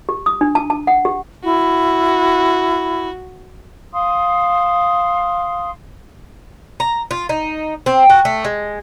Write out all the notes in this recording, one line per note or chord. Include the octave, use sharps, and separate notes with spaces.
G4
D#6
D4
A5
A5
F#5
G4
E4 F#4
F5 C6 D#6
A#5
F4
D#4
C4
F#4
A3
G#3